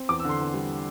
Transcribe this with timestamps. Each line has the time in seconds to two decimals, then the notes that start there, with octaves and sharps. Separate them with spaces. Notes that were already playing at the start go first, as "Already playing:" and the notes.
Already playing: C4
0.09 E2 D6
0.20 E6
0.24 D3 C6
0.39 E2
0.54 G3